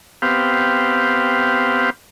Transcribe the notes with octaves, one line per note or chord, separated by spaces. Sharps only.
B3 C4 G4 F5